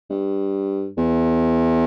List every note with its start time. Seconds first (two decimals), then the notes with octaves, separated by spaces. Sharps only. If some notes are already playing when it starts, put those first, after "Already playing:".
0.10 G2
0.98 E2